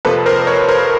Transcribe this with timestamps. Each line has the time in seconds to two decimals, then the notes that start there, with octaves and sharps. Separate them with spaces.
0.05 F2 C3 F3 A#3 A4 B4
0.26 A#4 C5
0.47 B4 C#5
0.68 A#4 C5